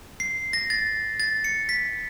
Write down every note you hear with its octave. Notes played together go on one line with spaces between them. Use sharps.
C7
A#6
A6
A6
C#7
B6